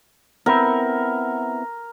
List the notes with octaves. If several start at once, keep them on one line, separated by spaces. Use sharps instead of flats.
B3 C4 E4 A#4